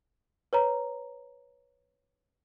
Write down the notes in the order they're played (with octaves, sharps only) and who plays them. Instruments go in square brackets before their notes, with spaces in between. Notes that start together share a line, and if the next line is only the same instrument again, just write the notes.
[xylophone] B4 C#5 A#5